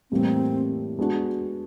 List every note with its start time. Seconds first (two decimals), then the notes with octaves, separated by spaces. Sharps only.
0.11 A2 E3 G3 A#3 C4
0.99 G#3 B3 D4 F#4